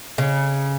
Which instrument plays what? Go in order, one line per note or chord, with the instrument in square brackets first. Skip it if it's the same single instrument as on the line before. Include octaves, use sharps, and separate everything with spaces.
[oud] C#3